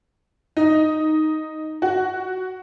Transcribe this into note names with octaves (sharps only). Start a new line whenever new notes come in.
D#4
F#4